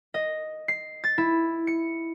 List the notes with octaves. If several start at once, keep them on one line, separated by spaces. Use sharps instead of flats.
D#5
C7
A6
E4
C#7